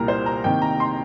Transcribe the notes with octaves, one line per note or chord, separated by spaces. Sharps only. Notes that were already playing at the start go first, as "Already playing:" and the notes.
Already playing: C2 A#2 G3 A#3 A#4 A#5
C5
A#5
C3 D#3 A#3 G5
A#5
C6